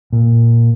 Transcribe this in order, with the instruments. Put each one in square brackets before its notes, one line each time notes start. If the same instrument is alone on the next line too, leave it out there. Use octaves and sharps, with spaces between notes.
[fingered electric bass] A#2